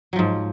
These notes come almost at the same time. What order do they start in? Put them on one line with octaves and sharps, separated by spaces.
F#3 F3 G#2